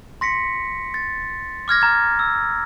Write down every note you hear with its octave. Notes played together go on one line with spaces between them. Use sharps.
C6 A#6 B6 C#7
A6
D6 F6 G#6 A#6
A#5 F6 G#6 A6
E6